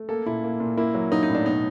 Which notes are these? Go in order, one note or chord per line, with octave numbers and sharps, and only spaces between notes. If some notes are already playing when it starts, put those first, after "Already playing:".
Already playing: A3
A#3 A4
A#2 E4
A#3
A#2
A#3 E4
F#3
F#3 D#4
D#4
A2
D4
B2 D#4